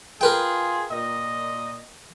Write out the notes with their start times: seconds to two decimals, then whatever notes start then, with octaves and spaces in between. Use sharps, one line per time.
0.21 F4 G#4 A#4 B4 G5
0.91 A#2 D#5